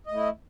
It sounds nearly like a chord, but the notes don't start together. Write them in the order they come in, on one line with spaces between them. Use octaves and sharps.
D#5 A3 E4